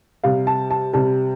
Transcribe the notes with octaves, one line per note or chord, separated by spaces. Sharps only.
C3 G3 F5
A5
A5
C3 G3 A5